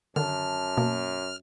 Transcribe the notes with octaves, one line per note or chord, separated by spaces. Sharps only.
F#2 D3 D#3 A5 F6
B2 A#3